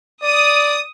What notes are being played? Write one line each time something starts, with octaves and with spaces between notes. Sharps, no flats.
D5 D#6